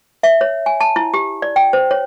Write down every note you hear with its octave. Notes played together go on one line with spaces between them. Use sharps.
E5
C#5
G#5
A5
E4
G4
D5
G5
C5
C#5